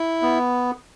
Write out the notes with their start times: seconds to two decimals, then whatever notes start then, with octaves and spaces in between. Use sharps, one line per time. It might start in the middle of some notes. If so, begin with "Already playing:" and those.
Already playing: E4
0.22 B3